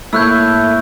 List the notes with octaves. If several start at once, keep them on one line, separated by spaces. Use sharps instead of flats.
G#2 A3 A#3 E4 C#5 E6 F#6 G6